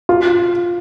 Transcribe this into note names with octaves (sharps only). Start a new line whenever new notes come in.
F4